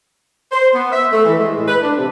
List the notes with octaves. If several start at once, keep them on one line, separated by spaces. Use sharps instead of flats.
C5
B3
E5
A3
E3
G#3
A2
B4
D4
C3